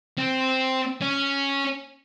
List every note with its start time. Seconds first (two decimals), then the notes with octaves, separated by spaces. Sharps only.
0.18 C4
1.02 C#4